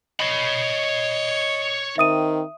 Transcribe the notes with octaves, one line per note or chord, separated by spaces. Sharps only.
C#5 D#5 B5
D#3 C4 E5 D#6 D#7